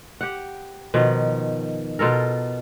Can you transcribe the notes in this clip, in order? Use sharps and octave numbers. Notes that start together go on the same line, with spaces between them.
G4 F#5
B2 D#3 F3
B2 F4 A4 A#4